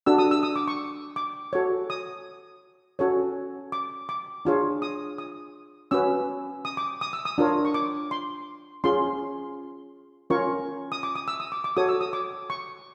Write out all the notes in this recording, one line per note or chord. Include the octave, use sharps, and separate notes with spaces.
D4 F#4 A4 E6
D#6
E6
D#6
D6
C#6
D6
F#4 A4 C#5
D#6
C#4 F#4 A4 C#5
D6
D6
D4 F4 G#4 C#5
D#6
D#6
C#4 F#4 B4 E6
D#6
D6
D#6
E6
D#6
D4 F4 A#4 C#5
C#6
D6
C6
C#4 F4 G#4 C6
C#4 F4 A#4 C#5 C#6
D#6
D6
D#6
E6
D#6
D6
D6
F#4 A4 C#5 D#6
E6
D#6
D6
C#6